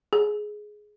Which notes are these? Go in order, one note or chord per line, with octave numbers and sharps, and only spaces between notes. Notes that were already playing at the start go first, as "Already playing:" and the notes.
G#4